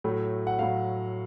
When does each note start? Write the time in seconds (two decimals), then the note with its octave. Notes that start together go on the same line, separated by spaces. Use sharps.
0.04 A2 F#3 A3
0.47 F#5
0.59 A2 F#3 A3 F5